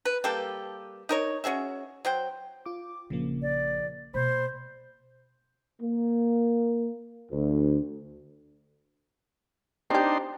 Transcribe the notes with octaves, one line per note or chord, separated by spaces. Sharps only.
B4
G3 A#3 G4 A4
D#4 A#4 C#5
C#4 F#4 G#4 E5
F#3 C5 G5
F4 D6
A#1 C#3 F3 A#3 C#4
D5
B2 A#3 C5 B5
A#3
D2
C4 D4 D#4 G4 C6